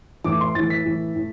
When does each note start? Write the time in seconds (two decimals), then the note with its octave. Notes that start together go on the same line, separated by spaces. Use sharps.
0.24 A2 E3 D6
0.41 C6
0.55 A2 E3 A6
0.70 B6
0.85 A2 E3
1.15 A2